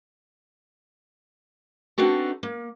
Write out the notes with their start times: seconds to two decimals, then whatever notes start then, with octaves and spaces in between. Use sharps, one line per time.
1.98 B3 C4 D4 D#4 F#4 A4
2.43 A#3